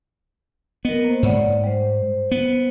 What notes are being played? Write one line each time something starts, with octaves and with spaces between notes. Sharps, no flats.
B3 A#4 D#5
A#3 C5
G#2 C#5 D5 F#5
G3 C5
B3